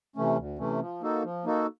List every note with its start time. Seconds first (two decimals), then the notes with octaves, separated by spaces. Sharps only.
0.16 C3 E3 A3 C#4
0.37 D2
0.58 C3 E3 A3 C#4
0.80 F3
1.01 A#3 D#4 F#4 A4
1.23 F3
1.44 A#3 D#4 F#4 A4